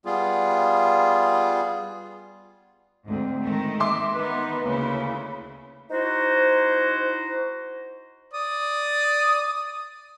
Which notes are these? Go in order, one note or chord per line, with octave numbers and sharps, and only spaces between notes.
G3 B3 F4 G#4
D2 G#2 C4
D#3 G#3 A3
E5 C6 D6
D#3 B3 D#4 B4
D2 C#3 A#3 E4
D#4 E4 F#4 C5
D5 D#6